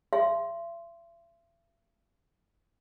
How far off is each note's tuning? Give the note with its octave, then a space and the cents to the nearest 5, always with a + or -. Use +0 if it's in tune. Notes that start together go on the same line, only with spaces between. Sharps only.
E5 +45 C6 +0